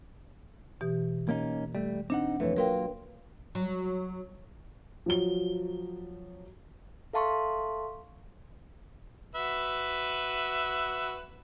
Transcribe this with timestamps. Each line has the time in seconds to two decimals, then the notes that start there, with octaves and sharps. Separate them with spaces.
0.81 B2 E3 G4
1.29 A#3 C#4 D#4
1.75 G3 A3
2.10 C4 D4 D#4 F#5
2.40 F2 E3 A3 B4 C#5
2.56 F#3 A#3 F4 A#4 B4 G5
3.55 F#3
5.06 F3 F#3 G7
7.13 A4 E5 F5 A5 C6 C#6
9.35 F#4 B4 E5